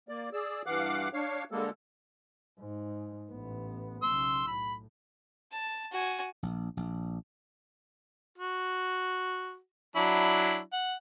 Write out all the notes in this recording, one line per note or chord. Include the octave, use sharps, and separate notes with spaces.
A#3 D5
G#4 D5 E6
G2 E3 F5 F#5 D6 F#6
D4 C#5 F5
D3 G3 G#3 A#3 A4
G#2
A1 B3
B1 C#3 C6 E6
A2 B5
A5
F#4 G#5
A#1
A#1
F#4
F#3 D4 E4
F#5